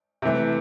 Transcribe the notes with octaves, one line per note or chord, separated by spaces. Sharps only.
C3 E3 A3